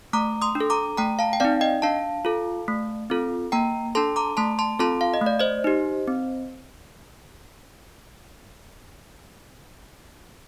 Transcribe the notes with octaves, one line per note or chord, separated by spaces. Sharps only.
A3 A#5 D6
C6 D#6
D4
A4
A#5 D6
A3 G5 A#5
F5 A5
G5
C4 D#4 D5 F5
D#5 G5
D4 F5 A5
F4 A4
A3
C4 F4 A4
A#3 G5 A#5
D4 A4 A5 C6
A#5 D6
A3 A5 C6
A5 C6
C4 F4 A4 A5 C6
F5
D#5
A3 D5
C5 D#5
D#4 G4
C4